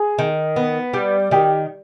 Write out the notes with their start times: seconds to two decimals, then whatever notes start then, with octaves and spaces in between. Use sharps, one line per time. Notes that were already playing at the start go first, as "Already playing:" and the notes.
Already playing: G#4
0.19 D#3
0.56 B3
0.94 G3
1.31 D#3 G4